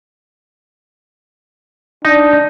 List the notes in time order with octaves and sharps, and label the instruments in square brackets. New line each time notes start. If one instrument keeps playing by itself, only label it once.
[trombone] D4 [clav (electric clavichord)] D#4